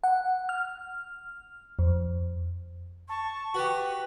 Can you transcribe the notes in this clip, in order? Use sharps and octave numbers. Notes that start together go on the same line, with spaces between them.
F#5
F6
F2
A5 C#6
F#4 G4 B4